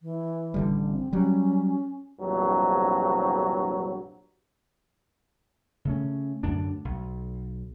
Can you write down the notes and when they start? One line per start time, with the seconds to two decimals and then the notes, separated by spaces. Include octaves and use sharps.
0.02 E3
0.54 A1 D3 G3
0.89 C4
1.13 F#3 G3 C#4
2.20 A#1 E2 G2 C3 F#3
5.85 C#3 A3 C#4
6.43 F#2 A2 D3 D4
6.85 B1